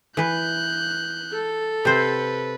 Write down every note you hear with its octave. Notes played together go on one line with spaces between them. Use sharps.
E3 B4 F#6 G6
A4
C3 B4 C5